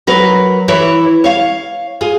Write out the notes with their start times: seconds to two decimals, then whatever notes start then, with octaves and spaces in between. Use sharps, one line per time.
0.07 F#3 A#4 B4
0.68 E3 E4 C#5
1.24 C#5 F5
2.01 F4 G#4